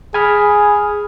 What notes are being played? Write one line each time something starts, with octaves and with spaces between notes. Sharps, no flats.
G#4 G#5 B5 F6